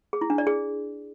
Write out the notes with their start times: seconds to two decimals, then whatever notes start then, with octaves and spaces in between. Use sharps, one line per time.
0.13 G#4
0.21 E4
0.30 D4
0.38 D5
0.47 G#4